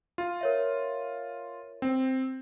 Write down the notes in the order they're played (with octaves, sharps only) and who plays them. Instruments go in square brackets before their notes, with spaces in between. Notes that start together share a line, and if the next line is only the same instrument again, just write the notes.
[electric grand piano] F4
[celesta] A#4 C#5 E5
[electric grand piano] C4